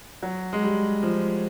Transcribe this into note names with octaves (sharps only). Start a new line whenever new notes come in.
F#3
G#3
G3
F3